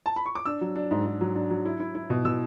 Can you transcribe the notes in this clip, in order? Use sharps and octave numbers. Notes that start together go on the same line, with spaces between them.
A5
B5
C#6
D6
D4 E6
F#3
D4
G#2
G#2
F#3
D4
F#3
E4
E4
E4
B2
B2 E6